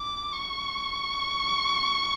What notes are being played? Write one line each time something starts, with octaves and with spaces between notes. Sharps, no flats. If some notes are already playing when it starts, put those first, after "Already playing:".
Already playing: D6
C#6